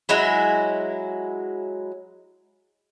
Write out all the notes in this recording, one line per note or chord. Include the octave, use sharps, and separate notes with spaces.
F#3 G#3 E4